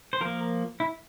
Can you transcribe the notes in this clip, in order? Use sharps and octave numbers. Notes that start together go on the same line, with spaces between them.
C5
F3 A#3 A#4
E4